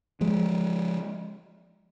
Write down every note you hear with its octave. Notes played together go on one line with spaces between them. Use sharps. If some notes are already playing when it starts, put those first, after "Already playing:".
F3 G#3